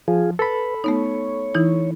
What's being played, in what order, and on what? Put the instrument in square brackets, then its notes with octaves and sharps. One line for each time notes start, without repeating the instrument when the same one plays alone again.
[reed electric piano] F3 [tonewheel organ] F4 G#4
[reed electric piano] A4 B5 [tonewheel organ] B4
[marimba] A3 B3 D#4 [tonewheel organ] C#5
[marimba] E3 D#4 E4